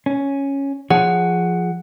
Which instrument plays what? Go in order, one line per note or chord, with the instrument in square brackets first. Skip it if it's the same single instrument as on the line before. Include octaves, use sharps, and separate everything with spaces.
[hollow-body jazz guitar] C#4
[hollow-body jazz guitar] F3 G#4 C#5 [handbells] F#5